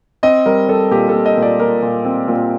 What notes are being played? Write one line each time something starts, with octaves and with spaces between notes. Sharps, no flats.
C4 D#5
G3 A#4
G3 A4
A#2 G4
A#2 A4
D#5
A#2
D5
A#2 A#4
A#2
C4
A#2